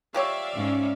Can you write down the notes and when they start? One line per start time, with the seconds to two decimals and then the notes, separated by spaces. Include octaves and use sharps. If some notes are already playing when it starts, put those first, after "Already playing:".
0.14 F3 G4 C#5 D5 E5 F5
0.55 G#2 C#4